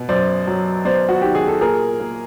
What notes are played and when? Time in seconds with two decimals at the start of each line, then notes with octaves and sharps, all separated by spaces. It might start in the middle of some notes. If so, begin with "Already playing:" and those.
Already playing: B2
0.09 F#2 C5 D5
0.47 F#3
0.85 B3 C5 D5
1.09 F#4
1.22 D#3 G4
1.35 G#4
1.48 A4
1.61 A#2 G#4 A#4
2.00 A#3